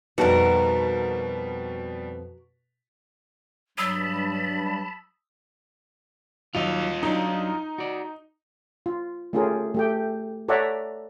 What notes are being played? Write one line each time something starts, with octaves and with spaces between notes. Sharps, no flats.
F2 B2 G3 D#4 F#4 A#4 B4 A5
G2 F#3 A5 B5 D#6 E6
D#3 F#3 F4 D#5 F7
F#3 D4 D#4
F#4 D5
F4
A3 C#4 F4 G4 G#4 A#4
A3 G4 G5
A4 C#5 D5 E5 F#5 A#5